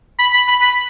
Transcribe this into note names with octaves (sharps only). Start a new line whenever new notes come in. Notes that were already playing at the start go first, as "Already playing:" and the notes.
B5
B5
B5
B5